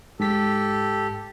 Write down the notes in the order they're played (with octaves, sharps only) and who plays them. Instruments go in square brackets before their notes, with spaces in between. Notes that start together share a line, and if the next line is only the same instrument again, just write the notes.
[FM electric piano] G#2 B6 [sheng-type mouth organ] G4 A4